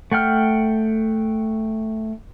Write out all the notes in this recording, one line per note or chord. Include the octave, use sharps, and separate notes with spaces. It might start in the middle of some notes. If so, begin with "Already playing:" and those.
A3 F#5 G5 F6